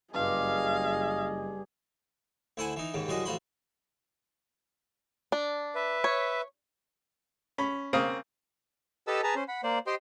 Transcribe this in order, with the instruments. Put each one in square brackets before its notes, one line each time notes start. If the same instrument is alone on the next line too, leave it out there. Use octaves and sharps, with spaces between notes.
[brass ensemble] F#1 D#5 [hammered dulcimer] G2 [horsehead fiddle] G#4 [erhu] F5
[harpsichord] D2 E4 C5 F#5 G#5
E3 D#4
D#2 G#2 C#3
C2 F#2 G3 F#4 G#4 D#5
A1 F3 F#4 B5 C6
[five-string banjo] D4
[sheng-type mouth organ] B4 E5
[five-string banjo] C#5
[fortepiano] C#4 B5
C#3 A#3 C4 F5 D#6
[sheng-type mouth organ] G4 A4 B4 D#5 A5 E6
G#4 B4 A5 A#5
C#4 C5
F#5 B5
A#3 C5 D5
G4 C5 D#5 G5 C6